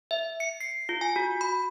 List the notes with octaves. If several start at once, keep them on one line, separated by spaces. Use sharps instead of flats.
E5
C#7
C7
F4
G#5
F#4
B5